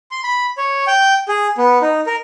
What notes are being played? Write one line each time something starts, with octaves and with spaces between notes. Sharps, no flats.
C6
B5
C#5
G5
G#4
B3
D#4
A#4